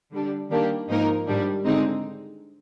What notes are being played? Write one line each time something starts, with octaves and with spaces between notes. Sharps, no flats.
D3 G3 D4
D#3 G3 A#3 D4 G4
G#2 F3 A#3 D#4 A#4
G#2 D#3 G3 D4
D3 G#3 C4 D#4